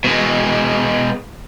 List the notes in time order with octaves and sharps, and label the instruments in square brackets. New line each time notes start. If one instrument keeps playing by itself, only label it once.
[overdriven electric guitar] B2 G#3